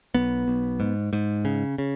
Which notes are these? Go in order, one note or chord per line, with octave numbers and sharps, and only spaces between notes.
B1 B3
B1
G#2
G#2
C#3
C#3